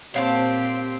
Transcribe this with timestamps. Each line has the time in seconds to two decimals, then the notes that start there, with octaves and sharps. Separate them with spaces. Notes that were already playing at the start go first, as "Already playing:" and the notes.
0.14 A#2 C4 G4 C5 C#5 F5 A5